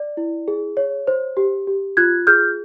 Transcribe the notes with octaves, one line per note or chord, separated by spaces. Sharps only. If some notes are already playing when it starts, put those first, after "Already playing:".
Already playing: D5
E4
G#4
C#5
C5
G4
G4
F4 F#6 G#6
G#4 F6 G6